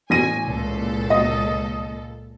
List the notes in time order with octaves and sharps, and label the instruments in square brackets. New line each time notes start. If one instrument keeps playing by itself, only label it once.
[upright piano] A1 A#6 D#7 [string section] G#5
[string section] C#2 A#2 A4
[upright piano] D#5